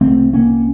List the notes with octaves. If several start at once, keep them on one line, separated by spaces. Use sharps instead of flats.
C2 C3 A3 C4
A#3 C#4